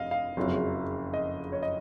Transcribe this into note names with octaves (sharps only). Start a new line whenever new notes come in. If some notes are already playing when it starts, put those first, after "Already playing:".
Already playing: F1 D#5 F5
F5
F#1 F2 C#3 F#3
D#5
C#5
D#5